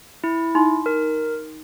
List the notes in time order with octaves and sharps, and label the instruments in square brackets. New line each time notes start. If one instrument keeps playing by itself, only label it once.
[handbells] E4
[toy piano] D#4 C6
[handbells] A#4